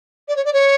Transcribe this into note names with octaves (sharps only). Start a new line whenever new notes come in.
D5
C#5
D5
C#5